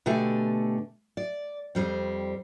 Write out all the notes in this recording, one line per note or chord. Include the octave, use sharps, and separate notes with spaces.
B2 D3 A3 G4 G#5
D5
F2 G3 C4